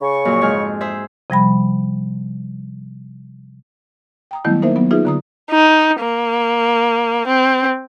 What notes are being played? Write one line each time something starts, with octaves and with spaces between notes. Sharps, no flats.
C#3 C#6
F2 A#2 F#3
G#2 G#5 F6
G#4 C5 E5
C3 F3 G3 B5
G5 A#5 D#6
D#3 F#3 G3 A3 B3 E4
A#3 D#4 A#4 C5 E5
F#3 B3
D#4 F4 G#4 B4 E5
D3 A#5 D#6
D#4
A#3
C4